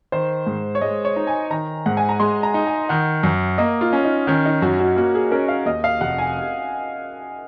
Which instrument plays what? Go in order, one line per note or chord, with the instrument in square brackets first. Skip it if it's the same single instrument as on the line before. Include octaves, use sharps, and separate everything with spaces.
[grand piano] D#3 [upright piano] C5
[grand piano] G#2
[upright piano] C#5
[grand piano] G#3 [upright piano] D#5
[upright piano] C#5
[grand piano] D#4
[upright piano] G#5
[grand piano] D#3 [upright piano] A#5
[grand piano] G#2 [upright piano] F#5
[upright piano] G#5
A#5
[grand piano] G#3 [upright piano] C6
[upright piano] A#5
[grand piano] D#4
[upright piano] G#5
[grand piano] D#3 [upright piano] F#5
[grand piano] F#2
[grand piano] A#3 [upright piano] D#5
[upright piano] F4
[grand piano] C#4
[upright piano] D#4
[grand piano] D#3 [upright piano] C#4
[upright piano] D#4
[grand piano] F#2 [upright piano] F#4
[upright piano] F#4
[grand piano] A#3 [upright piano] F#4
[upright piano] G#4
[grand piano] C#4 [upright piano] A#4
[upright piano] F5
[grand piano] D#2 [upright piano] D#5
[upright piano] F5
[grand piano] F1 [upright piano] F#5
[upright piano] G#5